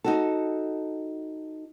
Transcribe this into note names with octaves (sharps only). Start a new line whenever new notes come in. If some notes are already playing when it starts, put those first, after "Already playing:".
D#4 F#4 A4